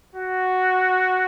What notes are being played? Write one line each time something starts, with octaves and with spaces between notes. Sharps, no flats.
F#4